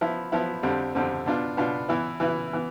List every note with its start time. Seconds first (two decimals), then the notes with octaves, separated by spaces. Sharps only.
0.01 F3 B3 E4
0.32 F3 B3 E4
0.63 F2 D3 G3 C4
0.95 F2 D3 G3 C4
1.26 B2 B3 D4 F4
1.57 B2 B3 D4 F4
1.88 E3 B3 E4 B4
2.20 E3 B3 E4 B4
2.53 E3 B3